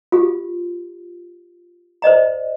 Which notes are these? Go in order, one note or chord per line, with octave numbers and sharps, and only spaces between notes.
F4 G4
C5 D5 D#5 A#5